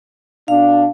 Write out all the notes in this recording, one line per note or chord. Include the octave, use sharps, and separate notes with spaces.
B2 D4 F5